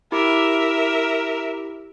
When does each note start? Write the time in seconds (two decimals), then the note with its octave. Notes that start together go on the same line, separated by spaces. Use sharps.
0.12 E4 G4 A#4 E5 D6